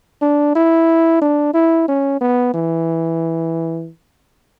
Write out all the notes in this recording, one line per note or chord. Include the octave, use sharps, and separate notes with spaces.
D4
E4
D4
E4
C#4
B3
E3